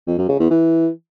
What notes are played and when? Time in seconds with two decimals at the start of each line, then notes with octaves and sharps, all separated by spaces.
0.07 F2
0.18 F#2
0.29 C#3
0.39 E2
0.50 E3